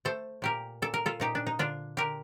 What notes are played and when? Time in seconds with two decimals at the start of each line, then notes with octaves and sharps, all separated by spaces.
0.05 A3 A4 C5
0.42 A#2 G4 A#4
0.82 A#2 A4
0.94 A#4
1.06 F4 A4
1.20 A#2 D#4 G4
1.35 D4
1.47 D#4
1.59 D3 D4 F4
1.97 D3 G4 A#4